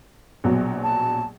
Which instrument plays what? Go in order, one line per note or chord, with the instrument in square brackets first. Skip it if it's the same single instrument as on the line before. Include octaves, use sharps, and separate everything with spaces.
[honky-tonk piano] A#1 B2 F#3
[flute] A5